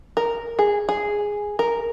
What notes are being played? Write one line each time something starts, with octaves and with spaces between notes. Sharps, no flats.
A#4
G#4
G#4
A#4